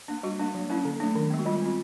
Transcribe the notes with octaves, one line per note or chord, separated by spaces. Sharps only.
A#3 D4
G3 F#4
A#3 D4
F#3
A#3 C#4 E4
D3
F#3 A3 D4
D#3
G#3 B3
F#4
G3 F4
C4 F4